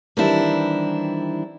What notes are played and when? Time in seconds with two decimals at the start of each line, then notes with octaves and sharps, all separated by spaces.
0.17 D#3 E3 G3 C4 D4 E4